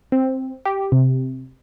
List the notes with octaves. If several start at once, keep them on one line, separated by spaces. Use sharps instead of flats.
C4
G4
C3